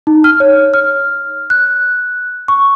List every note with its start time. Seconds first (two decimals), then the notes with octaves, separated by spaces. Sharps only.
0.07 D#4
0.24 F6
0.40 C#5
0.74 F6
1.50 F#6
2.48 C#6